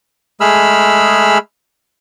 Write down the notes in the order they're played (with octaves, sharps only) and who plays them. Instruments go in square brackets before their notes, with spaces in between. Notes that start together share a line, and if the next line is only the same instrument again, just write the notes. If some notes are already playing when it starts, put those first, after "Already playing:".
[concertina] G#3 A3 G#4 B5 E6 F6